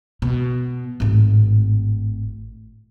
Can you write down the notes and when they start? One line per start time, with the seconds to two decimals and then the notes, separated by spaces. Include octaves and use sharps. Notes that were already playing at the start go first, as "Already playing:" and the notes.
0.22 B2
1.00 G#1 A2